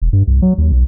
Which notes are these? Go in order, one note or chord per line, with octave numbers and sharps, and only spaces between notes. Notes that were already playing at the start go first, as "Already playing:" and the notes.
E1
G2
C2
F#3
D#2
B1